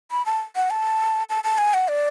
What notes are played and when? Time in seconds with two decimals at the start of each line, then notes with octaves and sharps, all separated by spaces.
0.11 B5
0.26 A5
0.56 F#5
0.70 A5
1.30 A5
1.44 A5
1.58 G#5
1.74 F#5
1.88 D5